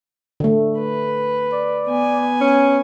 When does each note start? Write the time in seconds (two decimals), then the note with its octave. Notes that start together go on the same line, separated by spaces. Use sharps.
0.40 D3 A3
0.79 B4
1.52 D5
1.87 B3 G#5
2.41 C#4